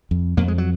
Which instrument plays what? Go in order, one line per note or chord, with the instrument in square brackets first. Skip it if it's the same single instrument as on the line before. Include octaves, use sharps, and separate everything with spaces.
[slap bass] F2
F2 A#3
G#3
F#3